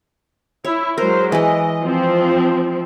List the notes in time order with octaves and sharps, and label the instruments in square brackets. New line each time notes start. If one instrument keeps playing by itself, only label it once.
[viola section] E4 [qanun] C#5
[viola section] F#3 G#3 C5 [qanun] A#4
[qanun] E3 G#3 [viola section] D#5
[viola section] F3 C4